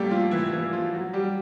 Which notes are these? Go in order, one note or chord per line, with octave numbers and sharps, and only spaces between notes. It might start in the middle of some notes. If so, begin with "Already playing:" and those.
Already playing: G3 A3 A#3 G4 A4
F3 F4
E3 E4
E3 E4
F3 F4
F#3 F#4
G3 G4